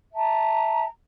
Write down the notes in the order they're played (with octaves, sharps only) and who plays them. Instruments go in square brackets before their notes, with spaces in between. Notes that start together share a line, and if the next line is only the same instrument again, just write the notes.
[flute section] E5 A5 A#5